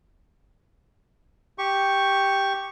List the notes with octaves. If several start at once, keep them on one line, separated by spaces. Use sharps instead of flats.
G4 C#6